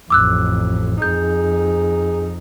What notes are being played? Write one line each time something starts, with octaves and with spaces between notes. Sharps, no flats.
A1 F2 D6 E6 F#6
F2 D#4 G#4 G6